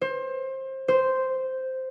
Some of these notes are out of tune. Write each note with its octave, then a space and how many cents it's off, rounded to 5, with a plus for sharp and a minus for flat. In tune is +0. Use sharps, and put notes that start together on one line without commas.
C5 +25
C5 -5